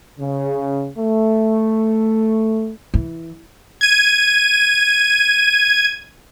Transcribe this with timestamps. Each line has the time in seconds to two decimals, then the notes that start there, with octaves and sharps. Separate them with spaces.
0.19 C#3
0.97 A3
2.94 E3
3.81 G#6 D#7